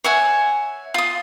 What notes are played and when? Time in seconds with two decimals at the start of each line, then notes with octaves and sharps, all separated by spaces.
0.04 C#5 E5 F#5 G#5
0.94 F4 D#6